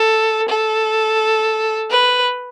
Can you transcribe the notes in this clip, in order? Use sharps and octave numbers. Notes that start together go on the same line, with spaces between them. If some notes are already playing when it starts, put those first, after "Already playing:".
Already playing: A4
A4
B4